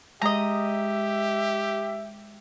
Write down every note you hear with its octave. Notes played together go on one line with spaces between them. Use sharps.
G#3 G4 D#5 E5 A#5